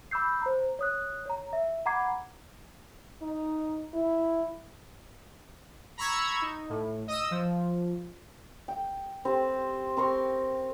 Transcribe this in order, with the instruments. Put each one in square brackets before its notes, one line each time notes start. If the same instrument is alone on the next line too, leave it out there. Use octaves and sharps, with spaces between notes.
[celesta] B5 D6 E6 G6 C7
C5 A#5
C#5 D#6 F#6
C#5 A#5
E5
F#5 A#5 B5 D6 G#6 C7
[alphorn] D#4
E4
[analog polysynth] A#5 B5 C#6 E6 G#6
D#4
A2
D#5 D#6 E6
F3
[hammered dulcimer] G5
C4 G4 C5
C4 A#4 C6 C#6